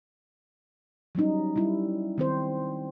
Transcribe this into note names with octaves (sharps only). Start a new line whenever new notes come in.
F#3 G3 C#4 D#4
G3 E4
D#3 C4 C5